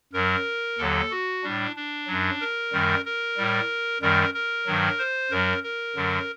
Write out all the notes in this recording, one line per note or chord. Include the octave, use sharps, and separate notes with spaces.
F#2 F#3 A#4
D#2 D3 F#3 A4
F#4
A2 G3 D4
D4
F#2 F#3
A#4
F#2 D#3 G3
A#4
A2 G3
F#2 D#3 G3 A#4
A#4
G2 D#3 F#3
C5
F#2 F#3 A#4
A#4
F#2 D3 F#3